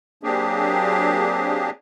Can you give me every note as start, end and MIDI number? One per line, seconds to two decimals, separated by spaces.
0.23 1.70 54
0.23 1.70 58
0.23 1.70 60
0.23 1.70 62
0.23 1.70 67
0.23 1.70 68